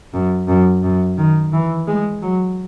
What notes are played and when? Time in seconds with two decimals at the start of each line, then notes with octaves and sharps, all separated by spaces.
0.14 F#2
0.48 F#2
0.83 F#2
1.18 D#3
1.53 E3
1.88 G#3
2.22 F#3